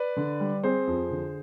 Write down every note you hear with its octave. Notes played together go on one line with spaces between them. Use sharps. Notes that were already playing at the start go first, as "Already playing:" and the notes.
Already playing: B4 D5
D3
G3
C4 G#4 C5
F2
D3